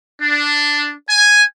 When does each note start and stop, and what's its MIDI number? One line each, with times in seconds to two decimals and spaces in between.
0.21 0.93 62
1.09 1.42 80